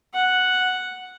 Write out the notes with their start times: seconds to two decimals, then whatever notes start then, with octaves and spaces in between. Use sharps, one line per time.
0.14 F#5